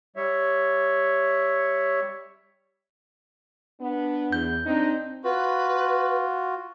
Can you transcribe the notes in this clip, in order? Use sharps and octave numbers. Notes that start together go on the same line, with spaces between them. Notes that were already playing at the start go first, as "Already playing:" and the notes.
G3 C#5 E5
B3 D4
E2 G6
C4 D4 D#4
F4 F#4 B4